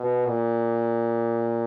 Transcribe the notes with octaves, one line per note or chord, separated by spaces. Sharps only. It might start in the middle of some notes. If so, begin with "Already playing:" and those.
Already playing: B2
A#2